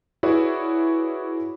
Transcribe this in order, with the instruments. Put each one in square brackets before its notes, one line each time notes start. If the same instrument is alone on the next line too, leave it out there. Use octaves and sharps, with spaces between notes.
[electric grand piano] E4 F#4 G#4 B4 C#5 D5